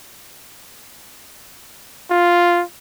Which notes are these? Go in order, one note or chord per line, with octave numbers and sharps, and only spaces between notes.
F4